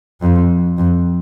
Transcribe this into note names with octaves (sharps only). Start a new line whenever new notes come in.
F2
F2